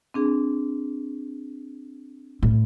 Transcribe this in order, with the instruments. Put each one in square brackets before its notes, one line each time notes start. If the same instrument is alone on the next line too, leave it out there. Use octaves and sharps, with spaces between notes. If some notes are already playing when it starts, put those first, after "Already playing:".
[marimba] C4 D4 G#4
[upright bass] A2